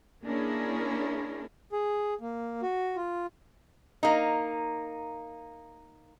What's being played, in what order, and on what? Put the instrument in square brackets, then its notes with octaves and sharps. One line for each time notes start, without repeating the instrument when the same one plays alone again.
[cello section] A#3 C#4 D4 E4 G#4 A#4
[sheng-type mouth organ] G#4
A#3
F#4
F4
[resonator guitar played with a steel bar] A#3 D#4